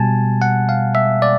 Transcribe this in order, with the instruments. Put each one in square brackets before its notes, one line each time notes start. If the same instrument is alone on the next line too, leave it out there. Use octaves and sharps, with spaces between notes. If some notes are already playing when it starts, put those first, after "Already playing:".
Already playing: [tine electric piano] B2 G3 G#5 A5
F#5
F5
E5
D5